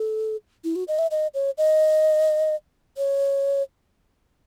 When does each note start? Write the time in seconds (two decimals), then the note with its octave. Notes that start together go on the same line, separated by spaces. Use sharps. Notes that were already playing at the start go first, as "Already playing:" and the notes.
Already playing: A4
0.64 E4
0.75 F#4
0.88 D#5
0.99 E5
1.11 D#5
1.34 C#5
1.58 D#5
2.97 C#5